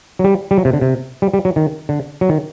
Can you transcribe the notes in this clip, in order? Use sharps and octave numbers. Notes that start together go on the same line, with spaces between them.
F#3
G3
G3
F#3
C3
D3
C3
G3
G3
F#3
D#3
D3
F#3
D#3